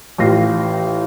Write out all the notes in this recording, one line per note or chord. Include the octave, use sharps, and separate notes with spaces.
A1 A2 F4 A#6 C7